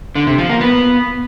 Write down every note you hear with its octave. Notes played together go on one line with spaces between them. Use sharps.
D3
C3
F3
A#3
B3